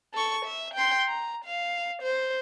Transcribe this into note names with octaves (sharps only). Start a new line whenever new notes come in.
A4 C#6
E5
G5 C6
A#5
F5
C5